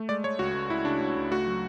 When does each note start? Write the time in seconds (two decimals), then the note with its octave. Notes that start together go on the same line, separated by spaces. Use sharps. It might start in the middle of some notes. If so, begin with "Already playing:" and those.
Already playing: A3
0.09 G#3 D5
0.24 G#3 C#5
0.39 C#2 F#4
0.54 C#2
0.70 C#2 E4
0.85 C#3 D4
1.00 C#2
1.16 C#2
1.31 A3 F#4
1.47 F#3